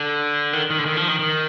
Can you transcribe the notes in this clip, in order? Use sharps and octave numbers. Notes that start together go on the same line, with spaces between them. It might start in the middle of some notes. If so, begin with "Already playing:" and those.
Already playing: D3
D#3
D#3
D3
D#3
F3
D#3
D#3